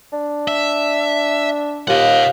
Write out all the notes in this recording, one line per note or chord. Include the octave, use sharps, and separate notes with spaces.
D4
E5
D#2 F4 G4 D#5 F5 F#5